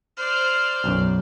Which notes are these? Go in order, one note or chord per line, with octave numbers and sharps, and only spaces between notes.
C5 D5 F6
B1 F#2